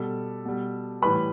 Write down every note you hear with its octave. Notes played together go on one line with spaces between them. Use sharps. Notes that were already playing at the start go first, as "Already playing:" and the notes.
Already playing: B2 G3 A4
B2 G3
A2 E3 G3 B4 B5